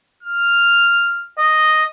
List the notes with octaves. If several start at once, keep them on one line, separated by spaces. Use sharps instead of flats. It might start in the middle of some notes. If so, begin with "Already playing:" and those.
F6
D#5